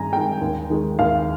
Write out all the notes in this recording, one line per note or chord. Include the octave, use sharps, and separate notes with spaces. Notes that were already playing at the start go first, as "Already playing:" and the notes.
Already playing: G2 D#3 G#3 G#5 A#5
D#3 G#3 G5
D#2
D#3 G#3
D#2 F5